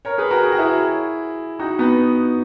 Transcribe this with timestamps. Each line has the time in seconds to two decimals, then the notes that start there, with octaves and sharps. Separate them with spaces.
0.05 A#4 C#5
0.18 G#4 B4
0.30 F#4 A#4
0.44 G#4
0.52 F#4
0.58 E4 G#4
1.59 D#4 F#4
1.79 B3 D#4